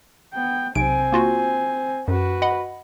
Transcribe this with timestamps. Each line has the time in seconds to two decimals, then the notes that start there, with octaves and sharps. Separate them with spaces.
0.34 B3 G5
0.75 B1 C3 C4 G#5 D7
1.12 A#3 F4 F#4
2.08 F#2 F#4 B4
2.42 D#5 F#5 B5